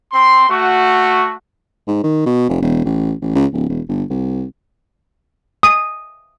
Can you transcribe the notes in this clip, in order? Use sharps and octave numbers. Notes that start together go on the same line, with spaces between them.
C4 C6
A3 F#4
G#2
D#3
B2
F1
E1
A1
A1
C#2
D1
E1
G1
C2
D#6